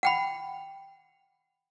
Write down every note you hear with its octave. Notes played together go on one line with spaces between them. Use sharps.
F#5 G5 B5